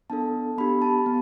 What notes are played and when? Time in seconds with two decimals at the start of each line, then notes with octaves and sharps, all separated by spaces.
0.10 B3 D4 A4 A5
0.58 B3 D4 G4 B5
0.82 A5
1.06 B3